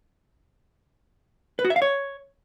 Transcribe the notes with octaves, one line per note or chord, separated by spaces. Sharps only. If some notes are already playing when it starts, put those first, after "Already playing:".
B4
F#4
E5
F5
C#5